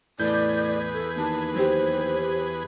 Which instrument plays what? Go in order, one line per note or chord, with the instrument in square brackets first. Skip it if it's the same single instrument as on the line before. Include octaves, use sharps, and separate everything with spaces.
[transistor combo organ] E2 G#4 B4 [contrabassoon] A2 [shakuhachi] D5 [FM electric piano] G6
[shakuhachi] A4
[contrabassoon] D#2 [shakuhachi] A5
[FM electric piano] F#3 G4 [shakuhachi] C5